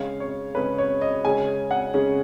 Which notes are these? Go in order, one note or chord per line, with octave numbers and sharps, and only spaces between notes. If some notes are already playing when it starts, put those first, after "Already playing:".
Already playing: C#3 G#3 C#4 F5
C#5
C#3 G#3 C#4 B4
C#5
D#5
C#3 G#3 C#4 G#5
F#5
C#3 G#3 C#4